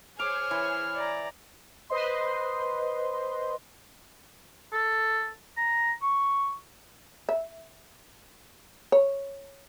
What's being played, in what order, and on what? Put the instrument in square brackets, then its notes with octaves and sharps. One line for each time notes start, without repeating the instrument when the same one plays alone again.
[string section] G#4 C5 C#5 [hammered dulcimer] D6 [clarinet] F6
[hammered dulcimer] E3
[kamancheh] D5 A#5
[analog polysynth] B4 C5 D#5 C6
[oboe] A4
A#5
C#6
[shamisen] E5
C#5